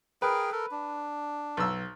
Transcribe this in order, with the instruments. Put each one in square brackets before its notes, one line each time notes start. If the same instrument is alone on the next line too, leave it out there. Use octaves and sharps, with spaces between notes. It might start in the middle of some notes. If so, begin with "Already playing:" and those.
[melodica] G#4 A#4 G5 [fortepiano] B4
[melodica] A4 A#4
D4
[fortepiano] B1 E6